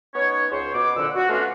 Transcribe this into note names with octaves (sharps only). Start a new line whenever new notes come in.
B3 C#4 D#4 C#5
C#2 C5 C#5
B2 D6
F2 A#2 D3 F#5 E6
F#4
A3 B3 C#4 D4 F4 F#4